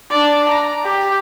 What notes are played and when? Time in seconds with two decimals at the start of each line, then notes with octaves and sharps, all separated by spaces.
0.10 D4 D5
0.48 A#5
0.84 G4